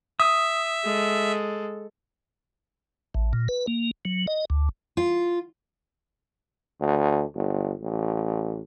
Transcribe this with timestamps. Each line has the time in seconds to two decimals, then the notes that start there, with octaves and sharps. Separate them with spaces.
0.20 E5 D#6
0.84 G#3 A4
3.14 A1
3.33 A#2
3.48 B4
3.67 A#3
4.05 F#3
4.27 D#5
4.50 D2
4.97 F4
6.81 D2
7.35 G1
7.81 A1